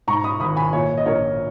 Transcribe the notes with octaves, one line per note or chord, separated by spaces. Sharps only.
G#2 A#5 C#6
B5 D#6
G#1 B5 D#6
G#5 B5
A#2 C#5 E5
D#5
A#1 A#4 C#5